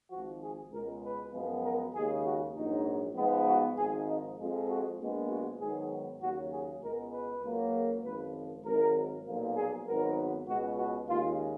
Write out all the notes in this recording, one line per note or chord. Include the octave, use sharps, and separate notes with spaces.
G#1 G#2 F3 F#4
G#4
C#2 B2 G#3 A#4
B4
F#2 F3 G#3 B3
A#4
D#2 C#3 G#3 G#4
F#4
A#1 G#2 F#3 D#4
G#2 F3 G#3 B3
F#4
G#1 G#2 F3 G#4
D#4
F2 F3 G#3
F#4
A#1 A#2 F3 G#3 B3
F#4
G#2 D#3 F#3 B3 G#4
D#2 C#3 F#3 F#4
G#4
C#2 B2 G#3 B3 A#4
B4
C#2 C#3 F#3 A#3
G#1 F#2 F3 B4
G#1 G#2 F#3 A#4
B1 A#2 F3 A#3
G#4
G#1 G#2 F#3 B3 A#4
C#2 B2 G#3 B3 F#4
F#4
D#2 C#3 G#3 F4